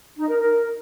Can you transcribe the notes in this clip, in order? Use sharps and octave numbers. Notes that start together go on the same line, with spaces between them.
D#4
A#4
A#4